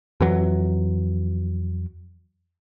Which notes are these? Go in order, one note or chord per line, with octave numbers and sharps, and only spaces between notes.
F2 E3 F#3